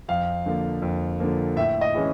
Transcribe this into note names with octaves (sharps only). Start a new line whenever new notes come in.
F2 F5
D3 F3 A#3
F2
D3 F3 A#3
A2 E5
D#5
E3 G#3 C#4